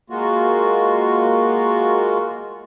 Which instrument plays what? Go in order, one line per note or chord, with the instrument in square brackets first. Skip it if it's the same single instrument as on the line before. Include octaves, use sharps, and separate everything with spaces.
[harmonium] G#3 A#3 F4 F#4